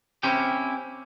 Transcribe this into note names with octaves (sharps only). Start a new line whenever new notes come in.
C4 C#4 E4 G4 G5